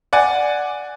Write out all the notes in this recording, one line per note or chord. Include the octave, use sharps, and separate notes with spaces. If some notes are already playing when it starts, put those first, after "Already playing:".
D5 F#5 G#5